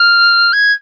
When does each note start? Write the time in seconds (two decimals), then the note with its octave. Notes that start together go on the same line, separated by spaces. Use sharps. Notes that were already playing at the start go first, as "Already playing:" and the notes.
Already playing: F6
0.53 G#6